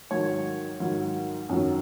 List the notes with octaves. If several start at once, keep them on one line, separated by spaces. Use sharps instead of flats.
G#2 D#3 F#3 C#5
G#2 D#3 F#3
F#2 D#3 F#3